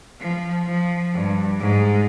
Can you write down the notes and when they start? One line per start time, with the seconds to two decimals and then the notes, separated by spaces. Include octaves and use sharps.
0.21 F3
0.67 F3
1.14 G2
1.60 G#2